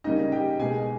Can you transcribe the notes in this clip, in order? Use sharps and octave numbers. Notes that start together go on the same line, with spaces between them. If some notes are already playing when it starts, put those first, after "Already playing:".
C#3 G3 A#3 C#4 D#4 D#5
G4 G5
B2 G#3 B3 G#4 G#5